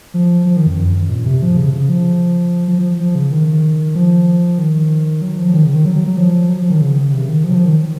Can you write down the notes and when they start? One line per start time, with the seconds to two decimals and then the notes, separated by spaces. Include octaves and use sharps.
0.14 F3
0.46 F3
0.57 D#3
0.67 F2
0.78 F#2
1.09 A#2
1.25 C3
1.42 F3
1.57 C#3
1.73 C#3
1.89 F3
2.68 F3
2.78 F3
3.00 F3
3.15 C#3
3.32 D#3
3.95 F3
4.58 D#3
5.22 F#3
5.38 F3
5.48 F3
5.54 D#3
5.65 C#3
5.75 D#3
5.85 F#3
5.95 F#3
6.06 F#3
6.17 F3
6.49 F#3
6.59 F3
6.70 D#3
6.81 C#3
7.12 C3
7.28 D#3
7.44 F3
7.50 F#3
7.55 F3
7.65 D#3